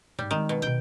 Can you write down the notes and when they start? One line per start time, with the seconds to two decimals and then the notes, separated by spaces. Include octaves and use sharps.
0.19 G#2 G3
0.31 D#3 G#3 C4
0.49 B2
0.62 B2 D#4 G5